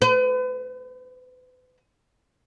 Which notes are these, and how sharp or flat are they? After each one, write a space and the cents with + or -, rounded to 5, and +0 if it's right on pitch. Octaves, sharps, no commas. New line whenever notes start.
B4 +40